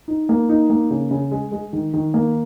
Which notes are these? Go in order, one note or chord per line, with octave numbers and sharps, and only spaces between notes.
D#4
A#3
D#4
A#3
C#3
C#3
G#3
G#3
D#3
D#3
A#3